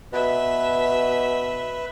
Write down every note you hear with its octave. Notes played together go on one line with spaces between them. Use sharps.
B2 B4 E5